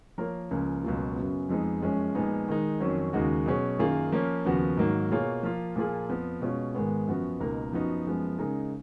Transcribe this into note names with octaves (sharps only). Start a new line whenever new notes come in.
F3 A#3 F4 A#4 C#5
C#2 C#3 F3 A#3
C#2 B2 F#3 A#3 F4
F#2 C#3 F#3 B3
F2 F3 G#3 B3 D#4
F#2 F3 G#3 C#4
A#2 F3 G#3 B3 D#4
D#3 G#3 D#4
F2 D#3 F#3 C#4
D#2 C#3 G#3 D#4 F#4
B2 F#3 C#4 G#4
F#2 D#3 A#3 F4 G#4
F3 A#3 C#4
D#2 C#3 F3 B3 F#4
G#2 D#3 F#3 A#3
B2 A#3 F4 G#4 C#5
F3 A#3 F4
A#2 F3 A#3 F4 G#4
F2 F3 B3
B2 G#3 C#4 F4
G#2 D#3 G#3 B3
F#2 F3 B3 F#4
C#2 B2 A#3 D#4 A#4
F#2 F3 B3 D#4 F#4
F#2 F3 G#3 B3
C#3 G#3 D#4 A#4